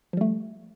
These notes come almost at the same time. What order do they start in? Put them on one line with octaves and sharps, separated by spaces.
F3 G3 A3